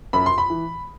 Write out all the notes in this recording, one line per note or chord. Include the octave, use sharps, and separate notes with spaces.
F#2 B5
C6
B5
E3